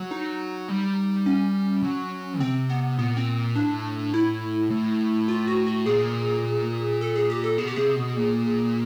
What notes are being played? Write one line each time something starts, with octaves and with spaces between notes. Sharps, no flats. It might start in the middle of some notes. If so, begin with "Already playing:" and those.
Already playing: F#3
D#4
G3
C#4
F#3
C3 C4
B3
A#2 B3
C4
A2 D4
E4
A2
F4
F#4
F#4
A#2 G#4
A4
G#4
G4
A4
B2 G#4
G4
C3 G#4
B2
A#2